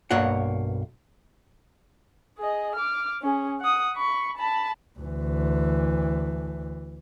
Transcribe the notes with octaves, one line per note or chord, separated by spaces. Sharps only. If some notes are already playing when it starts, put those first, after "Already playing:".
B1 G2 A#3 C#5 F#5
G#4 D#5
D6 F6
C#4 G#4
F#5 D#6
B5 C#6
A5 B5
D2 E3